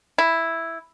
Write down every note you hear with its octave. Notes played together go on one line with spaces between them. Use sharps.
E4